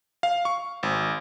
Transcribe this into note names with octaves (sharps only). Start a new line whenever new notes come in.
F5
C#6
G#1